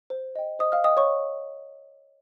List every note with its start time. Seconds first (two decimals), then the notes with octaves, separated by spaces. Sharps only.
0.10 C5
0.36 D#5 G5
0.59 C5 D#5 D#6
0.72 F5 F6
0.84 D#5 G5 D#6
0.97 C#5 C#6